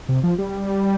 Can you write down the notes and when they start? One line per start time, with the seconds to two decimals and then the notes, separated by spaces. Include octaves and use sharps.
0.09 C3
0.24 F3
0.38 G3